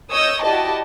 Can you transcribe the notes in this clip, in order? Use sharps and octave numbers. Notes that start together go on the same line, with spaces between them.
C#5 D#5 D#6 E6 G6
E4 F#4 G4 D5 D#5 A5